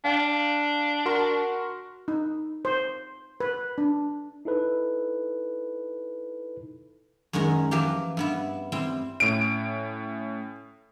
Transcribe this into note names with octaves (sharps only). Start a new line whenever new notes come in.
D4 F5 G5
F#4 A#4 C6
D#4
C5
B4
D4
D#4 E4 A4 B4
F#2 D#3 G#3 C#4 A#4
E3 F3 A#3 G4
G2 B3 E4
G3 C4 E4
A2 C#4 D7